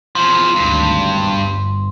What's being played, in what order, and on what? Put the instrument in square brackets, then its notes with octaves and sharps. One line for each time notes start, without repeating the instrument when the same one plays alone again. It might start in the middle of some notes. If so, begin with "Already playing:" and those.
[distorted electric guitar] E2 F3 [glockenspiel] C6
[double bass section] G#1 D2 [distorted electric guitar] G2
[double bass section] G1